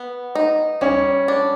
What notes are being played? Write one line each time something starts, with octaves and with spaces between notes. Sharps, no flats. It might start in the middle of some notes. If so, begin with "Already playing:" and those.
Already playing: B3
D#4
G3 C#4 C#5
D4